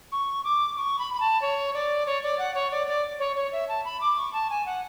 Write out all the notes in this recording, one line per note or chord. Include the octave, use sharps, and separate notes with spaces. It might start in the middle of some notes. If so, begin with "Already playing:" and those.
C#6
D6
C#6
B5
B5
A5
C#5
D5
C#5
D5
F#5
C#5
D5
D5
C#5
C#5
E5
A5
B5
D6
C#6
A5
G#5
F#5